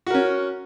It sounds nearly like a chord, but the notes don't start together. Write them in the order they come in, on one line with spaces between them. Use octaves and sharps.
F#4 A#4 C#4